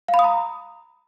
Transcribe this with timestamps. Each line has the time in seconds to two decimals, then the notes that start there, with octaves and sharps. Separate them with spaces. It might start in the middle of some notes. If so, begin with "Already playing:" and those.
0.08 F5
0.14 B5
0.19 D#6
0.24 A#5